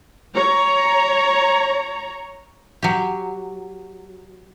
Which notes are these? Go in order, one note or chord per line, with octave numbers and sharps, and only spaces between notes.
C#5 A#5
F#3 G4